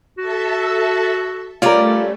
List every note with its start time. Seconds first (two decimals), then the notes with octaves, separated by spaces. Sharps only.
0.18 F#4 A4 E5 A5
1.62 G3 A3 C#4 F4 A#4 D5